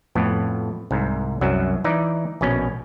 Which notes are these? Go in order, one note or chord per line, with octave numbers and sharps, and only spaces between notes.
F2 A2 B3
C2 G#2
C2 F#2 F#3
E3 D#4 D5
A#1 B2 C#4